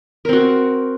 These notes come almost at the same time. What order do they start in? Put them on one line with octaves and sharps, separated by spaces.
A#4 C4 F#4